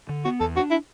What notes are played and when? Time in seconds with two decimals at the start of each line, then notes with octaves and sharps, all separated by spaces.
0.09 D3
0.25 B3 F#4
0.40 E2 A4
0.55 D4 F#4
0.71 E4